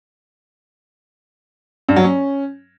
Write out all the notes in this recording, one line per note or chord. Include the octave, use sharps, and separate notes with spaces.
G2
F#3
C#4